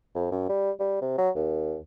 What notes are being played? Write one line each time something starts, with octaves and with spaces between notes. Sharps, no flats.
F2
F#2
G3
G3
C3
F#3
D#2